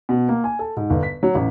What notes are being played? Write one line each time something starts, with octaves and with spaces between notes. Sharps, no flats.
B2
A#3
G#5
A4
G#2
G1
B6
F#3
A1